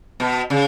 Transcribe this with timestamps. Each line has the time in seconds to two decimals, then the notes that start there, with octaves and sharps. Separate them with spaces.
0.20 B2
0.50 C#3